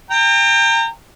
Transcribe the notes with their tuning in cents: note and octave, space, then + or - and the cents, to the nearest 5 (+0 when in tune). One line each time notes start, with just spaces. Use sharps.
G5 +25 A#5 -30